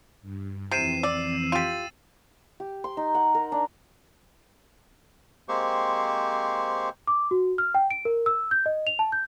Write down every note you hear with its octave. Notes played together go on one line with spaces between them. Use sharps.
G2
F2 C3 E3 C4 C7 D#7 E7
D5 E6
F4 G4 A6 D#7
G4
C6
D#4
F#5
A#4
D4
G#3 A#3 C4 G4 C5 C#6
D6
F#4
F6
G5
D7
A#4
E6
G6
D#5
F7
A5
G6